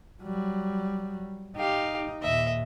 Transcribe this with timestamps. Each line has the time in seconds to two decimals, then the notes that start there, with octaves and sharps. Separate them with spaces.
0.23 F#3 G3
1.56 D#4 G4 F5
2.22 D#2 A#2 D#5 E5